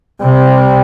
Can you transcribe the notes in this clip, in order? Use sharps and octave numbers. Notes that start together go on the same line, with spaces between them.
C3 G3